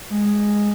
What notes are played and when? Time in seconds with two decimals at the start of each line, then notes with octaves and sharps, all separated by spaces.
0.10 G#3